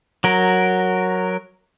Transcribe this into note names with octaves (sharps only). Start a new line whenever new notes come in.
F#3 A#4